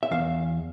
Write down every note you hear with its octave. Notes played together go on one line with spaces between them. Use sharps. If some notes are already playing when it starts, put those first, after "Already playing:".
E5
E2 F5